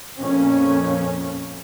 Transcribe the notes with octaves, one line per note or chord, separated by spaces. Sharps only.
F2 A#2 C#4